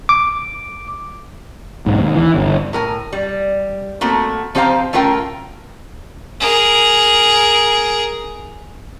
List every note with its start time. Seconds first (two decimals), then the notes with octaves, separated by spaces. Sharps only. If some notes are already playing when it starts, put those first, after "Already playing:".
0.09 D6
1.86 B1 G#2
2.01 D#2
2.15 E3
2.34 G1
2.73 A2 A#4 G#5
3.13 G3
4.01 A3 A#3 C4 F#4
4.55 F3 C4 G4 C5 F5 A#5
4.93 A3 C#4 F4 A#4 G5
6.40 G#4 A#4